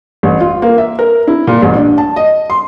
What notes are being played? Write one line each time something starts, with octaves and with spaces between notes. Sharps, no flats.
A1
F4
A#3
E5
A#4
E4
A#2
A1
D4
A5
D#5
C6